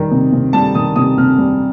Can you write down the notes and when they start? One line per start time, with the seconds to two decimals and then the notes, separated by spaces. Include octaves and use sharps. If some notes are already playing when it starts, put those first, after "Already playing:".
Already playing: D#3 G3
0.12 C3
0.33 C3
0.53 G3 A5
0.75 D#3 D#6
0.96 C3 D#6
1.18 C3 F6
1.38 G3